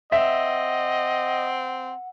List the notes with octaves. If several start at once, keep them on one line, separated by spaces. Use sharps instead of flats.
C4 D#5 E5 F#5